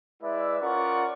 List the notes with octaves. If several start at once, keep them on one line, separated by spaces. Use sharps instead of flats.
G#3 E4 B4 D5 E5
C#4 F4 A#4 D5 F#5 C#6